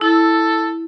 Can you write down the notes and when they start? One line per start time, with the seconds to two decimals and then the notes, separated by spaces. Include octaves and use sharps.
0.01 E4 A4